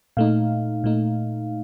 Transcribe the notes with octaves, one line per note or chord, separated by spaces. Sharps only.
A#2 A3 D#4 F5
A#2 A3 D#4